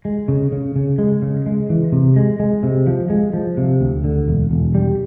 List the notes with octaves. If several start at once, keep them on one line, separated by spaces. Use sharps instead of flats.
G#3
C#3
C#3
C#3
G#3
C#3
G#3
E3
C3
G#3
G#3
C3
F3
G#3
F3
C3
D2
D3
E1
E1
G3